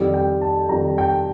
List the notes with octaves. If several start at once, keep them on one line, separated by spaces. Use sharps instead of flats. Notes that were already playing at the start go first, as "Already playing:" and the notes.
Already playing: F2 D#3 G3
G5
A5
F2 D#3 G3 A#5
G5